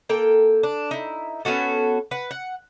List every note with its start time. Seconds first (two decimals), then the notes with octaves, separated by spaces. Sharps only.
0.09 A#3 A4 G5
0.63 D4
0.91 D#4 E4
1.45 B3 C#4 F#4 A4
2.11 B4 F#5
2.31 F#5